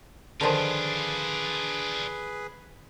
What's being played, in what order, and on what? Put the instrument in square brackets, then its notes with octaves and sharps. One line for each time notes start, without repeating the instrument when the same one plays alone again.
[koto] D3 D#3 F3 [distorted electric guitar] D4 F4 [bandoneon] G#4 B4